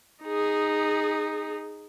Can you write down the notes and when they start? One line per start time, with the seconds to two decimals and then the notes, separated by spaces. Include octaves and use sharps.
0.23 D#4 G#4